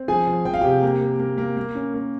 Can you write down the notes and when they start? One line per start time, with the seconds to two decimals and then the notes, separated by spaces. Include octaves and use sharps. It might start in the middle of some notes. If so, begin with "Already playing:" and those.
Already playing: C4
0.08 F3 G#4 G#5
0.27 F3
0.45 F3 G5
0.54 F5
0.61 C3 G4 G5
0.82 A#3
1.01 A#3
1.20 A#3
1.38 A#3
1.57 A#3
1.75 C#4
1.94 A#3